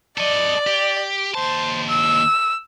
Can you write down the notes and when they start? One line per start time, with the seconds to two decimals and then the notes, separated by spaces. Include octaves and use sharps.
0.18 A4 D5 D#5
0.67 G4
1.35 D#2 C5 A5
1.89 E6